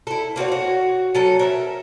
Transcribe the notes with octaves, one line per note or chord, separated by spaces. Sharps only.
E4 A4
A#3 C4 F#4 C#5
F#4 C#5
F#3 C#4 A4
A#4 B4 E5